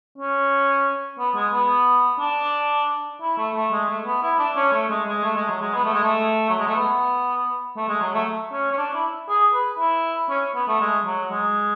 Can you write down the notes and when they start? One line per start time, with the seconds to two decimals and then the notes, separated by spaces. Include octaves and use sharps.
0.18 C#4
1.19 B3
1.36 G#3
1.53 B3
2.20 D4
3.22 E4
3.38 A3
3.55 A3
3.72 G#3
3.88 A3
4.06 B3
4.23 E4
4.39 D4
4.56 C#4
4.73 A3
4.90 G#3
5.07 G#3
5.24 A3
5.36 G#3
5.49 F#3
5.61 G#3
5.74 B3
5.85 A3
5.94 G#3
6.03 A3
6.50 F#3
6.59 G#3
6.67 A3
6.76 B3
7.77 A3
7.89 G#3
8.01 F#3
8.14 A3
8.53 C#4
8.72 C#4
8.78 D4
8.95 E4
9.29 G#4
9.54 B4
9.79 E4
10.30 C#4
10.55 B3
10.68 A3
10.81 G#3
11.06 F#3
11.31 G#3